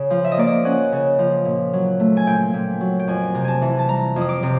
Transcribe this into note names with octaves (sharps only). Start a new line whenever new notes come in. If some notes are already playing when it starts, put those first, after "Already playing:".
Already playing: C#3
F3
E5
D#5
A#3 D5
D#5
C#4 F#5
C#3
F3
A#2
F#3
A3
G#5
A#2 G5
A#2
F#3
G5
F2 G#5
C3
G#5 A5
E3
A5
G3 A#5
F2
D#6
D6
C3